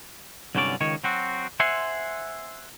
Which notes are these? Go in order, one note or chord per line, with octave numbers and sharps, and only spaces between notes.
C2 G2 D3 F#3 C#4 D5
C#2 D#3 C#5
F#3 C4 F#4
C5 E5 F#5 G#5 C6